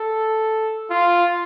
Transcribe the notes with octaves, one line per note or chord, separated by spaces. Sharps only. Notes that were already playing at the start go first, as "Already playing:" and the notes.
Already playing: A4
F4